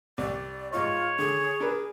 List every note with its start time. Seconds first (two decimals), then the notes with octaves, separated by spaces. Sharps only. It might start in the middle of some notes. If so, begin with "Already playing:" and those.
0.18 C2 D5
0.73 G#2 D#4 F4 C#5
1.19 D3 G#4
1.60 D4 A#4 B4